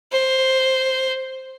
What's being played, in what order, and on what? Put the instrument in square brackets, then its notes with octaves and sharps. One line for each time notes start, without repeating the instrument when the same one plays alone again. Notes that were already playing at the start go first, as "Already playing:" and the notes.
[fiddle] C5